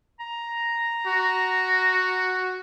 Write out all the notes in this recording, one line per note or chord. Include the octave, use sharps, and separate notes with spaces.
A#5
F#4